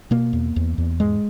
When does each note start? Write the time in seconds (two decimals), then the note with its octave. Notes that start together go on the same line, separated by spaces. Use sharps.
0.11 B2 A#3
0.33 E2
0.56 E2
0.78 E2
1.00 G#2 G#3